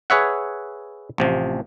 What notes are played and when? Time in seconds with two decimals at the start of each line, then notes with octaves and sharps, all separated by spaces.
0.10 G#4 B4 C#5 E5 F#5
1.18 A1 C3 F3